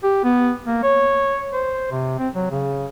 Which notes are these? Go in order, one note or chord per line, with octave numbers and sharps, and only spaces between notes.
G4
B3
A#3
C#5
C5
C3
C4
F#3
C#3